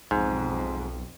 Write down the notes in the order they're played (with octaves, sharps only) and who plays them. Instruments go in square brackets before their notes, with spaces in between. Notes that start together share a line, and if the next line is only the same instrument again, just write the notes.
[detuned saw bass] B1 [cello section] F2 [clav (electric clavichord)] G#2